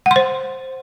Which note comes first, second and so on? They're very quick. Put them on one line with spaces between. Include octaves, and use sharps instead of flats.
F#5 C6 C5